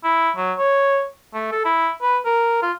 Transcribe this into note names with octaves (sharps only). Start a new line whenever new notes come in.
E4
F#3
C#5
A3
A4
E4
B4
A#4
F4